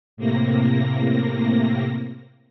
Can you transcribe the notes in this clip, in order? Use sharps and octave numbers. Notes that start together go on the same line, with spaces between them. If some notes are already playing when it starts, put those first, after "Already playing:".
A2 C3 A#3 A#6